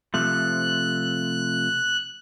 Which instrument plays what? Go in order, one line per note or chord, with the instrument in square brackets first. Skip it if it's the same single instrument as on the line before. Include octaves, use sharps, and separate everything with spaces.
[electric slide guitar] C3 F3 A3 [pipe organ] F#6